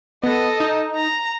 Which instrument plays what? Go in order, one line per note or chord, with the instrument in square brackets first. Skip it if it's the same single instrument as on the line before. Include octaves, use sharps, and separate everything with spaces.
[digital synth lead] B3 [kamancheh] A4 D#5
[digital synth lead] D#4
[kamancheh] A#5